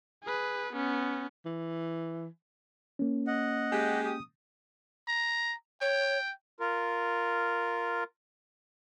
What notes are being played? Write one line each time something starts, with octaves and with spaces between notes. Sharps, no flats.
G#4 B4
B3 C#4
E3
A#3 C#4
D#5 F#5
G#3 G4
D#6
A#5
C#5 G5
F4 A#4